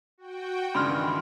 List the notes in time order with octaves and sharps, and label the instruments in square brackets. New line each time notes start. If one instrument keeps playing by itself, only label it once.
[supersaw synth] F#4 G5
[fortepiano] C#2 G2 [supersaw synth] D#3 E3 [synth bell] B5 C6 F6